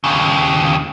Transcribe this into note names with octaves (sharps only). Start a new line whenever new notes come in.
D#2 C#3